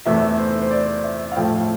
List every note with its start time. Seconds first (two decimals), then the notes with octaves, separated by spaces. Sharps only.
0.06 E2 C3 E3 A3 E5
0.38 C5
0.62 C5
0.71 D5
1.04 E5
1.32 F5
1.36 A2 F3 A3 E4 G5